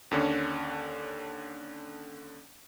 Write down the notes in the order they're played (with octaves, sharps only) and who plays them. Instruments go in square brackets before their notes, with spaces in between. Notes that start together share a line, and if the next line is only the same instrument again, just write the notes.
[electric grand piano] D#2 D3 C#4 D4